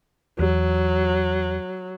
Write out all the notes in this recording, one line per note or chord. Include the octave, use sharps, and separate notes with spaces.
E2 F#3